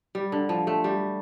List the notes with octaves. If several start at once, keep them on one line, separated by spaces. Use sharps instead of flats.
G3
D3
F3
A3
G3